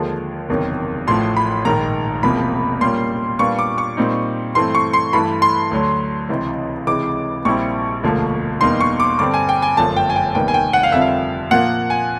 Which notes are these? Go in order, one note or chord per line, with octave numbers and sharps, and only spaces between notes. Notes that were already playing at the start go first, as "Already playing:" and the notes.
Already playing: D#2 D3 F3 G#3
F#1 E2 C3 D#3 F#3
A1 A2 F3 C6
B5
A#1 G#2 D#3 A#5
E1 E2 C3 F3 A#3 B5
A#2 G3 A#3 C#4 F4 C6
A#2 G3 B3 D4 F4 C#6
D6
C#6
A#2 G3 C4 D#4
G2 E3 A3 C4 C6
C#6
C6
G2 E3 A3 B5
C6
D2 D3 F#3
C#2 C3 E3
C#2 C3 E3 G#3 D6
A#1 A#2 G3 C4 E4 C#6
E1 D2 D3 F3 A#3
E2 B2 G3 A#3 D#4 C6
C#6
D6
G2 D3 G3 C4 D6
G#5
G5
G#5
G1 F#2 D3 F3 A3 A5
G5
G#5
G5
F1 D#2 D#3 G3 B3 G5
G#5
G5
F#5
F5
F2 D3 G3 C4 F4 E5
F5
A#2 F3 A#3 F#5
G#5